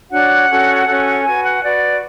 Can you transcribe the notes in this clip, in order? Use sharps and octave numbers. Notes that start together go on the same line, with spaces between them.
D4 F#4 C#5 F#5
C#4 F#4 A4
C#4 F#4 A4
F#4 B4 G#5
F#5
F#4 B4 D5